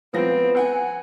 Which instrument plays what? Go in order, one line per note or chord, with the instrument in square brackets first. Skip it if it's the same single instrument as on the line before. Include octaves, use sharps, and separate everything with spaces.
[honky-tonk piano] F3 A#6 [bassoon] B3 [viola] C4
[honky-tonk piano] F#5 [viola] G#5